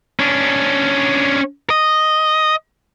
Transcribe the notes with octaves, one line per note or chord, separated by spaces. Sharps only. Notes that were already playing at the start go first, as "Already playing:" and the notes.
C#4 D4
D#5